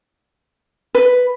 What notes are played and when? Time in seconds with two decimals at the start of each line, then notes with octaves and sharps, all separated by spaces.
0.95 B4